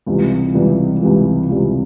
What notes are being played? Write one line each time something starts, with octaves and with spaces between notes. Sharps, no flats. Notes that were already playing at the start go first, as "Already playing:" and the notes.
C#2 C3 E3 G3
C#2 C3 E3 G3
C#2 C3 E3 G3
C#2 C3 E3 G3